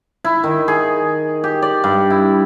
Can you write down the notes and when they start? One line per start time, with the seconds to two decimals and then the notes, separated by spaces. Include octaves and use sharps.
0.24 E4
0.44 D#3
0.68 G#4
1.44 G4
1.62 D5
1.84 G2
2.10 E4